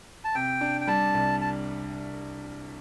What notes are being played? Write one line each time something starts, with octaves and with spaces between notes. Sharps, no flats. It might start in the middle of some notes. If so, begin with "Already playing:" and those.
A5
C3 G5
D4
G5
G3 A5
C2
A5